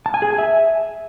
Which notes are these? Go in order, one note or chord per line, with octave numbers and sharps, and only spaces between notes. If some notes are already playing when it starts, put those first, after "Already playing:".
A5
G#5
G#4
G#5
E5